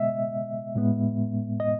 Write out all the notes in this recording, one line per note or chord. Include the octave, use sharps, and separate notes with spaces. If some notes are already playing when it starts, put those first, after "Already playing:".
Already playing: B2 G#3 B3 D#5 E5
A2 G#3 B3
D#5